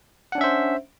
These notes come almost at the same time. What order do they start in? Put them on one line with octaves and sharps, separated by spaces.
F#5 D4 C#4 E5 C5